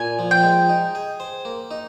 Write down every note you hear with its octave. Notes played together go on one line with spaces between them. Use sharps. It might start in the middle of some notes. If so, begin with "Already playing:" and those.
Already playing: A#2 G#5
F3
G5
G#3
D#4
G#4
C5
A#3
D#4